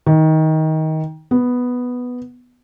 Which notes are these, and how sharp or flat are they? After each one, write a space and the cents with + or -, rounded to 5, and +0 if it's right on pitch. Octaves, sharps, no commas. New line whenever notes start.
D#3 +20
B3 +0